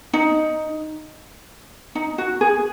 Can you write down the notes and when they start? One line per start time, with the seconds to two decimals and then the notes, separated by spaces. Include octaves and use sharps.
0.13 D#4
1.95 D#4
2.18 F#4
2.41 G#4